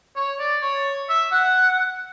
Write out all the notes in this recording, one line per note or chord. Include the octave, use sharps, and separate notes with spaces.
C#5
D5
C#5
E5
F#5